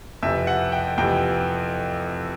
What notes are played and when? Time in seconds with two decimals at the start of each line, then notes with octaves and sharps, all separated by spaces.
0.23 F2 C3 E3 E5
0.47 F#5
0.72 G5
0.98 F2 C3 E3 G5